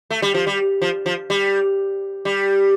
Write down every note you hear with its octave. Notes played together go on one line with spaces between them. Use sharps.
A3
G3
F3
G3
F3
F3
G3
G3